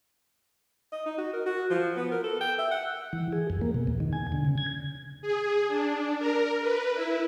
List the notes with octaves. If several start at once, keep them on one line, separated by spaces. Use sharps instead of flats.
D#5
D#4
F#4
A#4
F#4
F3
B3
A#4
A4
G5
E5
F#5
E3
G#4
F2
A#3
B2
E2
D#3
G#5
D3
C#3
G#6
G#4
D4
A#4
B4
E4